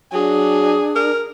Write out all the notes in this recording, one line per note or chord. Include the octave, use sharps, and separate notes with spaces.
F#3 D4 G#4
A#4